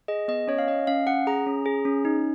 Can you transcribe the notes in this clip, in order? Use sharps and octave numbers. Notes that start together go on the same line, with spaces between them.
G#4 D#5
B3 D#5
C#4 C#5
F5
C#4 D#5
C#4 F5
C#4 F#5
G#4 A#5
C#4
G#4
C#4
D#4